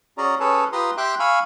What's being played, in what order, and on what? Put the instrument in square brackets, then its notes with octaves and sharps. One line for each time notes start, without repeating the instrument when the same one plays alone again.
[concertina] C#4 F#4 G#4 D5 A#5
C#4 G#4 A4 B4 C#5 A5
F4 G4 B4 A#5 C6 D#6
G4 E5 G5 C6 D6 F#6
F5 G#5 B5 C#6 E6